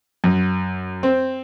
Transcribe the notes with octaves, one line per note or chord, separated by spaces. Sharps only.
F#2
C4